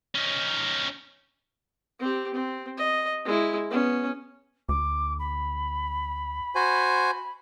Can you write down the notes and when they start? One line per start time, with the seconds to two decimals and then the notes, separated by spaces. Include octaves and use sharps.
0.15 C#4 D#4
2.00 C4 G4
2.34 C4
2.77 D#5
3.25 G#3 E4
3.71 B3 C#4
4.69 D2 D6
5.19 B5
6.55 F#4 C5 G#5